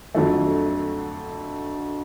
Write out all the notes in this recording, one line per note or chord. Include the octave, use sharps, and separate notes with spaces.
F2 D3 F#3 A3